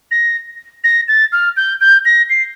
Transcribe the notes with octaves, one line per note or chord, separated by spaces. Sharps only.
A#6
A#6
A6
F6
G6
G6
A#6
C7